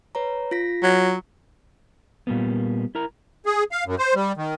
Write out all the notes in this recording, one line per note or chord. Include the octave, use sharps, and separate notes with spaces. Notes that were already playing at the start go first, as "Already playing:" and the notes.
B4 C#5 A#5
F4 A#6 B6
F#3
A#2 G3 A#3 B3
E4 A#4 A#5
G#4
F5
F#2
C5
G3
D#3